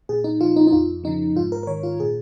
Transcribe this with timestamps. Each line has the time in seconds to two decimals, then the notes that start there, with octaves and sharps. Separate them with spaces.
0.09 A#2 G#4
0.24 D#4
0.41 F3 F4
0.56 D#4
0.67 D#4
0.73 F2 F4
1.04 C#3 F3 D#4
1.36 G#2 F4
1.52 A#4
1.63 A#4
1.67 D#3 C#5
1.83 F4
2.00 A#2 G#4